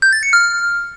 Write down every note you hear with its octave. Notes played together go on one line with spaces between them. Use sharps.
G6
A6
C#7
F6